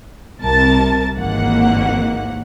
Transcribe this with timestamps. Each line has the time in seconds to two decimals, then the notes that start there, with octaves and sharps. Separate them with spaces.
0.42 C2 C3 A#4 A5 A6
1.16 G#1 D#2 D#3 E3 A#3 F#5